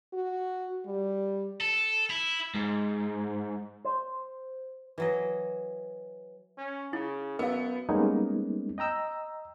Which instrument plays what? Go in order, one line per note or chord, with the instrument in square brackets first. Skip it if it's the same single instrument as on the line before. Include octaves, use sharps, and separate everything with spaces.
[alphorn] F#4
G3
[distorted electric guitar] A4
E4
[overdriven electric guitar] G#2
[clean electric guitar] C5
[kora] E3 F#3 D#5
[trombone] C#4
[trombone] C#3 [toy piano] E4
[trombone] F#2 [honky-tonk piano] B3 [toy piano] A#4 F5
[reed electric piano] G3 G#3 A#3 B3 C#4 D#4
D#5 G5 A#5 E6